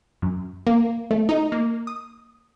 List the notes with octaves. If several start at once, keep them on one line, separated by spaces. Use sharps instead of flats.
F#2
A#3
A3
D#4
A#3
D#6